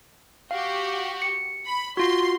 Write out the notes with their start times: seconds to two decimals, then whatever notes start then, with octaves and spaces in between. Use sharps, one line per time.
0.51 F#4 G4 F5
1.22 C#7
1.66 B5
1.97 F4 F#4 C6